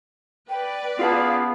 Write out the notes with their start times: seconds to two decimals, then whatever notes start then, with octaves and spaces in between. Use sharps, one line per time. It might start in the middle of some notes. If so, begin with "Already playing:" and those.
0.49 B4 D5 G5
0.99 B3 F4 G#4 F5 A5